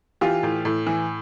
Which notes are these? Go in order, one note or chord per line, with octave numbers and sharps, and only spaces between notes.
E3 F4 G4
A2
A2
E3